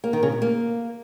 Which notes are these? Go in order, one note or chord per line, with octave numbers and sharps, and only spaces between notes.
A#3
D#3
C#3
B2
A#3